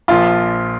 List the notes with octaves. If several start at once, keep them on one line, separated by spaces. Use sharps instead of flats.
A#1 A#2 F3 F4